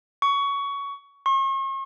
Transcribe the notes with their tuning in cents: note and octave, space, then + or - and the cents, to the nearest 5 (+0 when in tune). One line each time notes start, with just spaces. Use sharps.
C#6 +20
C#6 -45